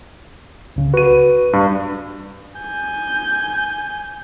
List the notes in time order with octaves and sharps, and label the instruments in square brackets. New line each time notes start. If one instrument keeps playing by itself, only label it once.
[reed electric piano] C#2 C#3
[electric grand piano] F#4 D#7 [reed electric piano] B4
[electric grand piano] G2
[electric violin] G#5 G6